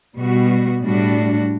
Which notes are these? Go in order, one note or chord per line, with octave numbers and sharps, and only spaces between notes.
B2 G3 B3 F#4
A2 G3 D4 F#4